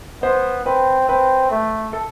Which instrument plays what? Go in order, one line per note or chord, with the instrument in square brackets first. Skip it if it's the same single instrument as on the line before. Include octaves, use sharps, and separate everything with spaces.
[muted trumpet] B3 [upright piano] C5
[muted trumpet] C4 [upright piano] B4
[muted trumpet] C4 [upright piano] B4
[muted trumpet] A3
[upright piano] A4